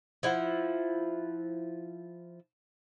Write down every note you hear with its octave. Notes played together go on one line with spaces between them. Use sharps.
F3 E4 F#5